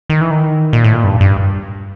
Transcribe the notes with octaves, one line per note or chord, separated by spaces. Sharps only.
D#3
E3
D#3
A#2
A2
A#2
G2
G2